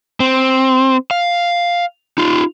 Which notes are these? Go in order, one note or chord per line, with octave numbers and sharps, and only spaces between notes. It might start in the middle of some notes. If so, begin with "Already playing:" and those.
C4
F5
D#4 F4